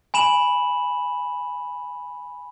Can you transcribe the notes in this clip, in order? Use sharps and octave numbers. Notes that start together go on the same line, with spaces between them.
G#5 B5 E7 F#7